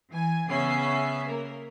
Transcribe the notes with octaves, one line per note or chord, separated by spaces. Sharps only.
E3 G#5
C#3 B3 C#4 E5 C7
A#3 A#4